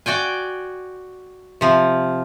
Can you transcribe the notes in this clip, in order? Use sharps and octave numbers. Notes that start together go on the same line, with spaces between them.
F#4 D5 G5 G#5
C3 F3